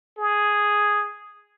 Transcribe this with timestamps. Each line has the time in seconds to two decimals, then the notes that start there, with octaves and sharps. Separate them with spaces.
0.18 G#4